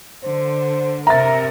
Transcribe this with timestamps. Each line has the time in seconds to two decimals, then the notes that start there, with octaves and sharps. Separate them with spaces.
0.24 D3 C5
1.07 C3 A#4 E5 A#5 A6